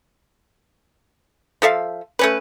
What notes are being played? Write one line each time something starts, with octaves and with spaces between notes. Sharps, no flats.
F3 A4 E5 F5
A3 C#4 B4